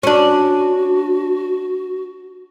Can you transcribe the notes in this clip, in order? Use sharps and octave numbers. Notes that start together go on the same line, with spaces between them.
C#4 D4 F#4